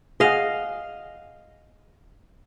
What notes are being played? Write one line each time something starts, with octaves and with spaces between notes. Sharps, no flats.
G#4 D#5 F5 F#5